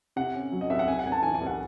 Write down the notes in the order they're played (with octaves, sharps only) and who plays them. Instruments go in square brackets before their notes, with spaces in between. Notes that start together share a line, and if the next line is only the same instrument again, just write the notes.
[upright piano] C3 F#5
C#4
F#3
D#5
C2 E5
F#5
C3 G#5
F#5
C2 G#5
A5
E3 G#5
G#5
C2
F#5